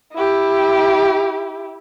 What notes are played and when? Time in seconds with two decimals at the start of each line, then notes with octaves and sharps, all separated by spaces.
0.13 E4 G4